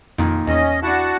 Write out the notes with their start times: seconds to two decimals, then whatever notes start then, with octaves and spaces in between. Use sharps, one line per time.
0.18 F2 A#2 D#3
0.47 E2 C#4 D#5
0.83 D4 E4 F#4 F#5 A5